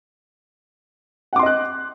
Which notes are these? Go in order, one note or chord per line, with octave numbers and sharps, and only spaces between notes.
D#5 F#5 C6 D6 F#6